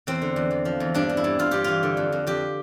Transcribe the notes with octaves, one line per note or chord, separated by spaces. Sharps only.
E2 C4
D3
E2
E2
F3
E2
G2 D4
G2
E4
G2
G2 F4
G2 G4
E3 F4
D3
F2
F2
F2 G4